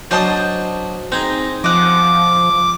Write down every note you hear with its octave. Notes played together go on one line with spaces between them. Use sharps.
F#3 D4 C5 D#5 A5 D#6
C4 D#4 G#4
F3 D#5 F#5 D6